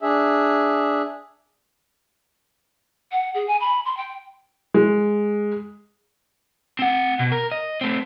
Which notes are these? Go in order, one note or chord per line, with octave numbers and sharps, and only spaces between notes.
D4 G#4 E5
F#5
G#4
G#5
B5
C6
G5
G#3
C4 F#5
B2
A#4
D#5
A3 C4